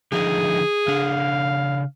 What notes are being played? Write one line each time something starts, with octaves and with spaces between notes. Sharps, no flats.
D3 F3 D#4 G#4
C#3 D4 F5